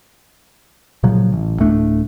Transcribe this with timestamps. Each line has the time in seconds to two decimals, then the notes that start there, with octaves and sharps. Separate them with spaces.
1.03 A#2 C#3 F3 F#3
1.32 A1
1.59 D1 A2 A3 D4